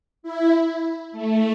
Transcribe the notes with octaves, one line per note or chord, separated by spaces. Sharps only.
E4
A3